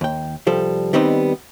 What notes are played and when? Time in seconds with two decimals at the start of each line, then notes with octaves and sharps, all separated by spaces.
0.01 D#2 G5
0.47 C2 F3 G3 A4
0.93 D#3 G3 B3 C4 D#4